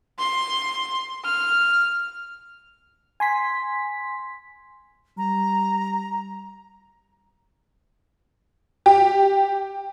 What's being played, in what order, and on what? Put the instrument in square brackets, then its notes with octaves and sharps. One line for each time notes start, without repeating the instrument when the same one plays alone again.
[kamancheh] C6
F6
[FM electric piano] G#5 C6 B6
[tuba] G3 [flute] A#5
[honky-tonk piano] G4